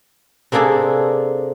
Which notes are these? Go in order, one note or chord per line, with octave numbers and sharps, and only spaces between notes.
C3 A#3 D4 G#4 A4